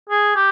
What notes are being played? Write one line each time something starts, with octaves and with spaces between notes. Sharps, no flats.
G#4
G4